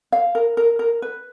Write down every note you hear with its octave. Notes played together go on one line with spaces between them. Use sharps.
F5
A#4
A#4
A#4
B4